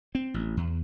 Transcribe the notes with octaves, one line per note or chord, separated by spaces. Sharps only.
C4
A1
E2